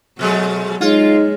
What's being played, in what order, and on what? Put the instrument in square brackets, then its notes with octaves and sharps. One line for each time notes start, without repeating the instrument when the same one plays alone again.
[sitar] B2 G#3 A3 [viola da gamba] F#3
[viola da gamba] G#3 [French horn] D#4 [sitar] F4 [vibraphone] G#4 C#5